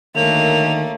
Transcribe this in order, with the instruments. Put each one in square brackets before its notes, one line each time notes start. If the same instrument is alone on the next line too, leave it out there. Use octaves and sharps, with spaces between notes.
[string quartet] D2 A3 C#5 [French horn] D#3 [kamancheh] A#3 [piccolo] F7